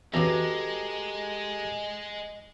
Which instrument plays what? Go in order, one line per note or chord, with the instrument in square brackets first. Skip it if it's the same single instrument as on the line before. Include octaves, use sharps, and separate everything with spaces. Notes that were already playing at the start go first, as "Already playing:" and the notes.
[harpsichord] E2 C#3 [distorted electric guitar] G#3 [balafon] F#4 B4 [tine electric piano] G4 A4 A#5